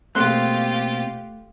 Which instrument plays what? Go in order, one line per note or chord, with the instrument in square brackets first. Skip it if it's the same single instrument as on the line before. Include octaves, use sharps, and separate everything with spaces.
[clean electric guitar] B2 A#3 C4 [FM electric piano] A3 [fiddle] F4 G4 [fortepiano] C6 F#6